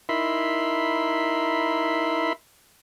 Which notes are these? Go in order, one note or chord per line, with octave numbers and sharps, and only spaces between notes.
D#4 E4 A#4 E5 B5 C6